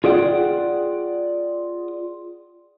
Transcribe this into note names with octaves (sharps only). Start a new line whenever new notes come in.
F4 G#4 D5 E5 F#5 G5